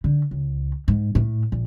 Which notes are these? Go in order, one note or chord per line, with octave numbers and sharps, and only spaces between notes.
D3
C#2
G#2
A2
A#1